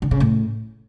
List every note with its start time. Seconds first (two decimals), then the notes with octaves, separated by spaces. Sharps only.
0.02 D3
0.11 C#3
0.20 A2